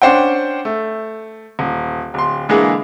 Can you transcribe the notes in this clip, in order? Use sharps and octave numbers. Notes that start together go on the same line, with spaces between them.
C#4 D4 C5 F#5 G5
A3
D#1
D1 C6
D3 E3 G#3 A#3 G#4